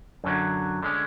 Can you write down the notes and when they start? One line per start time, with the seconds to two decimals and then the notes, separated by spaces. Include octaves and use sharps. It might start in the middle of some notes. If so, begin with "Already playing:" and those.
0.24 F#2 D3 F#3
0.83 D3 G#3 C#4